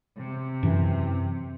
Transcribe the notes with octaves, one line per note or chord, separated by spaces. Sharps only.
C3
F#2 E3